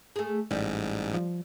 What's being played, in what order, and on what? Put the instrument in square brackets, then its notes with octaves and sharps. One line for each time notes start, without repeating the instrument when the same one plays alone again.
[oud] A3 G#4
[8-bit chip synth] A1 G#2 [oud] G3
[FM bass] F3